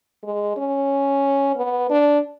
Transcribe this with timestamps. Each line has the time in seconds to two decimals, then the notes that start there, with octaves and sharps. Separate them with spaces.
0.24 G#3
0.57 C#4
1.56 B3
1.90 D4